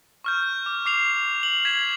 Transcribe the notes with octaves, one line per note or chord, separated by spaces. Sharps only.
C#6 F6 G6
D6
D6 C7 F7
F#7
G#6 B6 E7